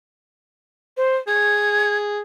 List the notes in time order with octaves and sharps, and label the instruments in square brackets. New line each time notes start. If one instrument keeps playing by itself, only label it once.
[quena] C5
[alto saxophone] G#4 [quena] G#6